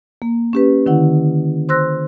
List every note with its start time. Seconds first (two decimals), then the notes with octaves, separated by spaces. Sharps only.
0.22 A#3
0.53 C#4 G4 B4
0.86 D3 D#3 E4 F#5
1.69 C5 C6 E6 F#6 A#6